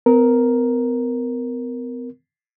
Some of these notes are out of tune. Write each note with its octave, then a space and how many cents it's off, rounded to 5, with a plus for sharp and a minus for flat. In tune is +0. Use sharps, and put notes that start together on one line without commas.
B3 +45 A#4 +0